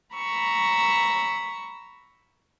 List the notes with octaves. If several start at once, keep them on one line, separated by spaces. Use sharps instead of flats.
A#5 B5 C#6 E6